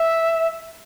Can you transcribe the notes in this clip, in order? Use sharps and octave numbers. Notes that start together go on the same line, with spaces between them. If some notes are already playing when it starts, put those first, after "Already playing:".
Already playing: E5